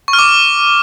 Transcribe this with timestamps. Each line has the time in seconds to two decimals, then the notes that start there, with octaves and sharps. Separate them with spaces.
0.08 C#6
0.13 F6
0.19 D6